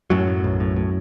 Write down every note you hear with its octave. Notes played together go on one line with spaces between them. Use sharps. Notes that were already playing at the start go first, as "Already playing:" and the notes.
F#2 A2 F#3
A2
B1
A2
A2